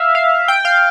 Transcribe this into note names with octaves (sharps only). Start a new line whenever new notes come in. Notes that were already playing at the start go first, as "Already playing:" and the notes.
Already playing: E5 F5
F5
G5
F5